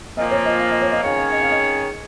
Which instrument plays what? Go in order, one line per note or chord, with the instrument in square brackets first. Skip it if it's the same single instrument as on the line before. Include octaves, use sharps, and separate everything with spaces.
[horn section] A#2 F3 A#3 [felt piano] D#5
[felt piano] C#5
D#5
F5
D#5
C#5
D#5
[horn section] D#3 C#4 G#4 C#5 [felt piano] F5
[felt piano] F5
D#5
F5
D#5